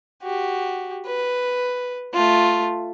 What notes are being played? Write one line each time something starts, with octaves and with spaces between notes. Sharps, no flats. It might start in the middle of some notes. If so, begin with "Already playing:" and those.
F#4 G4
B4
A3 F4